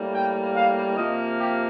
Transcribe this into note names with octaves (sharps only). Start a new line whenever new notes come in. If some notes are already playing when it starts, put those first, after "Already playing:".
Already playing: A2 G3 A#3
G5
F5
C3 F3 A#3 D#5
G4